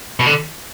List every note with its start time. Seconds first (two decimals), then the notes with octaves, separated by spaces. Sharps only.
0.20 B2
0.26 D3